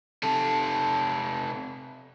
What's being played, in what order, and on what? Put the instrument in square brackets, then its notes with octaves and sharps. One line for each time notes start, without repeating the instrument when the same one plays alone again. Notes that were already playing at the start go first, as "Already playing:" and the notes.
[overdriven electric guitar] C3 A4